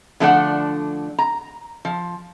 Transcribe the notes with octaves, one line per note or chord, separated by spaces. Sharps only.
D3 F3 A3 D4 D5 F#5
A#5
F3